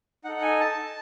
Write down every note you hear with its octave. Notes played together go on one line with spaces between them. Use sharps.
D#4 A4 F#5
G#5
A5